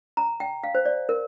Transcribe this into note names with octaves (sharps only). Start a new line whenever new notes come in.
A#5
G5
F5
C5
D5
A#4